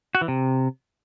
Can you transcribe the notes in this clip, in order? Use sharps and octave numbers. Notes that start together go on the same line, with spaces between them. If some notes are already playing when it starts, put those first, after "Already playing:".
F#4
E3
C3